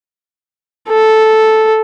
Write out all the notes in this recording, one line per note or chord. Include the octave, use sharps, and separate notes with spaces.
A4